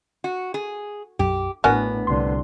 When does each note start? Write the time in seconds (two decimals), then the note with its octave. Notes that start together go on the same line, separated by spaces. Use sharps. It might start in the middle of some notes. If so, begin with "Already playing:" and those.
0.24 F#4
0.54 G#4
1.19 B1 F#2 G4
1.64 A1 A2 B3 D4 F#4 A#4 G#5
2.07 C2 D3 C6